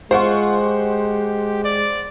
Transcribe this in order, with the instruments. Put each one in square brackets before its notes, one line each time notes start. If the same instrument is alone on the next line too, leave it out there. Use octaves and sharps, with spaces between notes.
[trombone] G#3 [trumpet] F4 [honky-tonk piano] C5 F#5 C#6
[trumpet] G4
D5